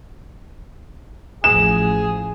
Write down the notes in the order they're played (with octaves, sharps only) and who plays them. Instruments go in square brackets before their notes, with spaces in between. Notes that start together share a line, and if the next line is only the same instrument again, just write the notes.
[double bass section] A1 F3 [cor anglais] G#4 [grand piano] E7